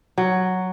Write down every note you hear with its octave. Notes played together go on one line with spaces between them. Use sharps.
F#3